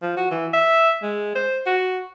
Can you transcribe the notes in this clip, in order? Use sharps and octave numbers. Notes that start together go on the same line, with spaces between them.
F3
F#4
E3
E5
G#3
C5
F#4